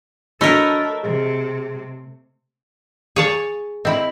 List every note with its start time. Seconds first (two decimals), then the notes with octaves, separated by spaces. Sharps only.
0.41 A3 D4 F#4 A4 A#4 C#5 D#5 B5
1.03 C3 G#4
3.16 G#4 C#5 A5
3.85 C4 E4 D#5 B5